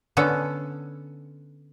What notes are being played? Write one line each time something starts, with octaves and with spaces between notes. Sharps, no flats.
D3 B3 C#4 A4